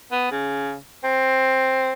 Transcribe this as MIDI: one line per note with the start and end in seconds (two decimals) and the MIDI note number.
0.12 0.31 59
0.32 0.76 49
1.04 1.93 60